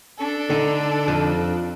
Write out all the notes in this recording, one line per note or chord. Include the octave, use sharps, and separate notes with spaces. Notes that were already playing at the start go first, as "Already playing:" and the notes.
D4 A4
D3 D#4
F2